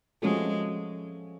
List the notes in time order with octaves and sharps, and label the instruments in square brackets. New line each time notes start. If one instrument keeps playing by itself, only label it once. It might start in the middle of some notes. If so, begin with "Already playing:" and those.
[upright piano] F3 A3 C#4 F#4 A4 [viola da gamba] G#3